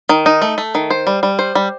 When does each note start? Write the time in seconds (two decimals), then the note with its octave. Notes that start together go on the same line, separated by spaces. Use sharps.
0.09 D#3
0.26 D#4
0.42 A3
0.58 A3
0.75 D#3
0.90 C5
1.07 G3
1.23 G3
1.39 C5
1.55 G3